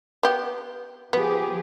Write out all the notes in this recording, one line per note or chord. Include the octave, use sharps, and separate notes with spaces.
B3 G4
F3 B3 G4 G#4